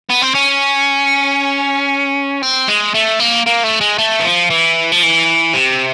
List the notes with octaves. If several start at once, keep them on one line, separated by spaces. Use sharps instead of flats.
B3
C4
C#4
C4
G#3
A3
A#3
A#3
A3
G#3
A3
E3
F3
E3
F3
E3
C3